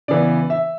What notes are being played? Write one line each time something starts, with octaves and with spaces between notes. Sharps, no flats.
C#3 E3 B3 D5
E5